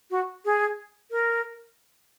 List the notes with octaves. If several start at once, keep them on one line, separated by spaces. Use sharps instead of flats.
F#4
G#4
A#4